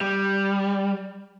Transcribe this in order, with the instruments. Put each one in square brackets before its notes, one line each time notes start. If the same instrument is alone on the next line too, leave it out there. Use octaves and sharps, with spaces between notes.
[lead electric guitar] G3